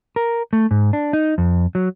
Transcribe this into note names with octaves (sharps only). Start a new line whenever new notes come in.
A#4
A3
G#2
D4
D#4
F2
F#3